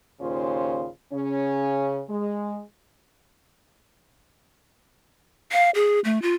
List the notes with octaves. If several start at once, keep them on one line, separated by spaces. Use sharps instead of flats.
D#2 A#2 C#3 C#4 F4 C5
C#3 C#4
G#3
F5
G#4
A3
F4